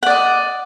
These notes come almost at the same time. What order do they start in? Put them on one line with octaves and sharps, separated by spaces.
F#5 D5 D#5